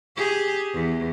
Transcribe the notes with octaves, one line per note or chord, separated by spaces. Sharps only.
G4 G#4
E2